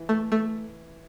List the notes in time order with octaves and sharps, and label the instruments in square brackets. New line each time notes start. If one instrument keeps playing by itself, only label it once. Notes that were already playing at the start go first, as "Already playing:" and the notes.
Already playing: [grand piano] E3
[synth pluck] A3
A3